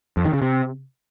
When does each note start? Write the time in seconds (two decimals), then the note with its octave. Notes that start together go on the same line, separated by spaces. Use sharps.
0.17 F2
0.25 D#3
0.33 C#3
0.42 C3